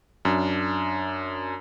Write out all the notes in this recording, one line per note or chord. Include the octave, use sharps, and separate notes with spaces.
F#2 D4